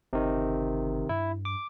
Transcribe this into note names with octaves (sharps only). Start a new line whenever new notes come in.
G1 C3 D#3
G2 E4
D6